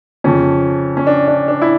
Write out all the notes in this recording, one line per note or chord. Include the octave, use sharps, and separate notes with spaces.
F2 C#3 F3 C#4
C#4
D4
D4
D4
E4